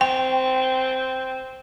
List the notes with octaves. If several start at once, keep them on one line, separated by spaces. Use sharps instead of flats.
C4 G5